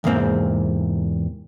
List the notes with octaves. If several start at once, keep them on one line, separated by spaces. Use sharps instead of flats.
E2 G#2 C3 A#3 C4